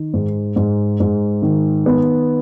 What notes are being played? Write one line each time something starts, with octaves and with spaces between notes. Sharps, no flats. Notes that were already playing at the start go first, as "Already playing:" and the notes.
Already playing: D#3
G#2
G#2
G#2
D#3
B3